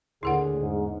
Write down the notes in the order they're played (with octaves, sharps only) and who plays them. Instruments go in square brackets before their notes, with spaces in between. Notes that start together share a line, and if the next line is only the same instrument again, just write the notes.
[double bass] D#2 D3 [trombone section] A2 G#4 [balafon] E4 A#4 F#5
[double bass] E2 [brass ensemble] G#2